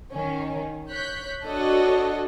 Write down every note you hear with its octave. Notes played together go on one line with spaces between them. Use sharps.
D#3 C#4
C#5 F#6 G6 B6
D4 F#4 A4 C#5 D#5